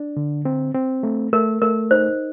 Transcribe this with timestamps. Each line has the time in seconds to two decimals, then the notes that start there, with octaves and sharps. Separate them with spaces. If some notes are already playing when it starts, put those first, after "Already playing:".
Already playing: D4
0.17 D3
0.45 C4
0.75 C4
1.03 A3
1.33 A3 A#4
1.62 A3 A#4
1.91 D#4 C5